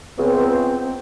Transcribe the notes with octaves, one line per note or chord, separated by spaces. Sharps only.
C#2 B3 C4